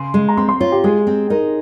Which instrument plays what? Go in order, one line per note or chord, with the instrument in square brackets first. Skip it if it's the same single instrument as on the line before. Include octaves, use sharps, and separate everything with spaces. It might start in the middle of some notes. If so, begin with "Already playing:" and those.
Already playing: [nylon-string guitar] C#3 [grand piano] C6
[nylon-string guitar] G#3
[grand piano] A#5
[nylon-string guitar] C4 [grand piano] C6
[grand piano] C6
[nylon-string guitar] F4 [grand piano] C#5
[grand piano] G4
[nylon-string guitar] G#3 [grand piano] G#4
[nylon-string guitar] C4
[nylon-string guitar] D#4 [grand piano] A#4